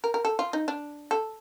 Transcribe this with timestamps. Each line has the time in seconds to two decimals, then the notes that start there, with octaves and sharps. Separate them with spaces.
0.04 A#4
0.14 A#4
0.25 A4
0.39 F4
0.53 D#4
0.68 D4
1.11 A4